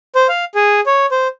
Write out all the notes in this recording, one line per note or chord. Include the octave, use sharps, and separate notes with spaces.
C5
F5
G#4
C#5
C5